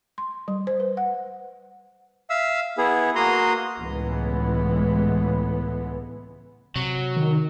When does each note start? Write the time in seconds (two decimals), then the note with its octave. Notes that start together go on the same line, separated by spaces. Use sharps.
0.18 C6
0.48 G3
0.67 C5
0.80 B4
0.97 F#5
2.30 E5 F5 E6
2.78 B3 E4 G#4
3.15 A#3 F#4 A#5 C6 D#6
3.79 C#2 A2 E3 G#3 B3
6.76 C3 F#3
7.17 D#3